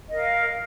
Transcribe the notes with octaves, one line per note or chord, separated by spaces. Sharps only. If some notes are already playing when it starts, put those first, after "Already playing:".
A#4 D#5 F5